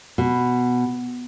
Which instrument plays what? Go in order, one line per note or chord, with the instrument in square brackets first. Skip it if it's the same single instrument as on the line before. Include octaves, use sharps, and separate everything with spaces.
[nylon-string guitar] B2